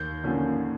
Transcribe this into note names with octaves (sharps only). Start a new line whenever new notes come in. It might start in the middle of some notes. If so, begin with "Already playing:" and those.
Already playing: D#2 G6
D3 F3 A#3 C#4